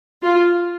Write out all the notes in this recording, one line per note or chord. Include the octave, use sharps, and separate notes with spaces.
F4